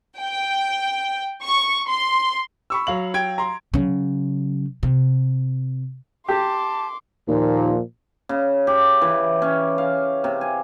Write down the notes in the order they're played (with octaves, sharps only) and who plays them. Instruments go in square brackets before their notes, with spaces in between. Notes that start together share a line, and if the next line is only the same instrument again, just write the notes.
[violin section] G5
C#6
C6
[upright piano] B5 C#6 E6
[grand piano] F#3 F5 F#7
[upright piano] G5 G#6 D7
A#5 C6
[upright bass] C#3 F#3
C3
[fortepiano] G4 [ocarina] A5 [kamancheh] C6 D6
[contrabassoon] D#2 [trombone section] A#2 F3
[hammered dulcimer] C#3
G4
E3
C#4
F5
C3
G#5